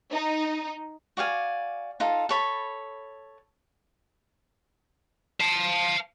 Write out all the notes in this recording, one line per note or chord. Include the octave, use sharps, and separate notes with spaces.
D#4
F#4 D5 F5 G#5
D#4 F4 A4
A4 C#5 B5
F5 A5